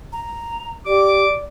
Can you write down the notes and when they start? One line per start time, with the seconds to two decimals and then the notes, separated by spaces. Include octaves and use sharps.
0.13 A#5
0.86 G4 D5 D6